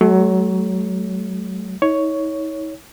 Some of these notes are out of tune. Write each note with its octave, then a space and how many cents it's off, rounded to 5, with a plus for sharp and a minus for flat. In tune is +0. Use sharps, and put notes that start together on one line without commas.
F#3 +20 A3 -30 C#5 +15
D#4 +40 C#5 +5